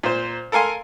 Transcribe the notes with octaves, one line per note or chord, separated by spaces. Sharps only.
A#2 C5
A4 A#4 F5 G#5 C6